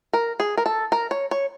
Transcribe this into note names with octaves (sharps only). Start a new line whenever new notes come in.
A#4
G#4
A#4
A4
A#4
C#5
C#5